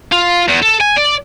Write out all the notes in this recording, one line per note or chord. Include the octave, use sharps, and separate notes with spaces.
F4
E2
A4
G#5
D5